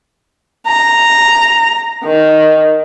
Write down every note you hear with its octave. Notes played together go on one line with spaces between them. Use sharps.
A#5
D#3